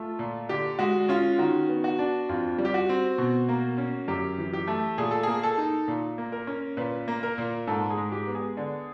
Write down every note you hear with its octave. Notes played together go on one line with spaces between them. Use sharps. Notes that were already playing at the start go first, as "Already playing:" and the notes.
Already playing: A3 F4
A#2
D3 G4
G#3 F#4
C#4 F4
D#3 F#4
B3
F#4
D4
F2 F4
G3
G4
F#4
C4
B2
A#3
C#4
F#2 G4
E3
G4
A3
A#2 G#4
A4
A#3 G#4
A4
D#4
A#2
A#3
A#4
C#4
A#2 B4
A#3
A#4
A#2
G#2 A4
G#4
G#3
G4
B3
G#4
D3